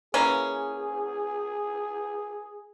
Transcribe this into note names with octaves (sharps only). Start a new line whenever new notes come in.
E3 A#3 C#4 G#4